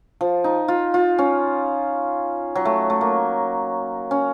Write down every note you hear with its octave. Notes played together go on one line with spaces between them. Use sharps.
F3
D#4
F4
F4
C#4
F#3
A3
A3
A#3
C#4